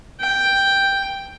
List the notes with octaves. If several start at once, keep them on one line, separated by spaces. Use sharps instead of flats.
G5